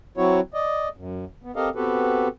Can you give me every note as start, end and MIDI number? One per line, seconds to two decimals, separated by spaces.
0.17 0.40 54
0.17 0.40 60
0.17 0.40 64
0.17 0.40 66
0.17 0.40 73
0.54 0.88 74
0.54 0.88 75
0.97 1.25 42
1.43 1.52 59
1.56 1.69 60
1.56 1.69 67
1.56 1.69 69
1.56 1.69 70
1.56 1.69 75
1.56 1.69 77
1.75 2.28 59
1.75 2.28 60
1.75 2.28 66
1.75 2.28 67
1.75 2.28 69
1.75 2.28 71